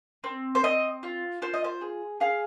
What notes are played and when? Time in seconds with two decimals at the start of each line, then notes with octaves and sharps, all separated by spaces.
0.24 C4
0.55 C5
0.64 C4 D#5
1.03 F4
1.42 F4 C5
1.54 D#5
1.64 C5
1.81 G#4
2.20 G#4 F5